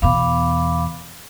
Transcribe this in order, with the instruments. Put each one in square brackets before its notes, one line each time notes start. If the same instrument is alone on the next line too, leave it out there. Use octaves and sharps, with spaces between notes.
[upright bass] E2 B2 [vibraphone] F5 B5 D6